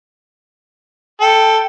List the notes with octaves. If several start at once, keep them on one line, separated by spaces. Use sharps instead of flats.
A4 G5